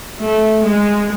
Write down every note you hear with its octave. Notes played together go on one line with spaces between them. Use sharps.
A3
G#3